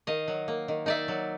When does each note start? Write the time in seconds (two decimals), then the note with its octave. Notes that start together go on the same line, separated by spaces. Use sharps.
0.07 D#3 D#5 F5
0.28 F#3
0.48 A#3
0.68 D#3
0.86 D#4 D5 E5
1.08 F#3